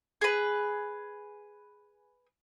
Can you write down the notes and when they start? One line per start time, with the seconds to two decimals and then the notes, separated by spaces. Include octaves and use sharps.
0.21 G#4 B4